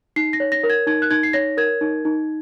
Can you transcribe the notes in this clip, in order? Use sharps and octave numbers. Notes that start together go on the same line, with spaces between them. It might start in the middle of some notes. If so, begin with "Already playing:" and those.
D#4 C7
A#6
C#5
A#6
A#4
G#6
D#4 G#6
F#6
D#4 G#6
C7
C#5 A#6
A#4 G#6
D#4
D#4